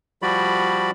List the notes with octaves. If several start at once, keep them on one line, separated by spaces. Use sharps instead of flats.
F3 G3 F#4 D5 B5